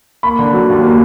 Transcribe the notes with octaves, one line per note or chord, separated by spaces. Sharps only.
A#3 B5
D3
F#3
D#2
A#3